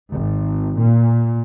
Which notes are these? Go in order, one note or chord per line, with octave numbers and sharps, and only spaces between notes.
G#1
A#2